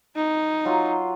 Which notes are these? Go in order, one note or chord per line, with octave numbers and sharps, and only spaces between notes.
D#4
F#3 F4 C6